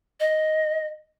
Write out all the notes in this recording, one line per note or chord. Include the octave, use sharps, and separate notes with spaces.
D#5